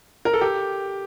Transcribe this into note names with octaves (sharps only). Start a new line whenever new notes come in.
A#4
A4
G4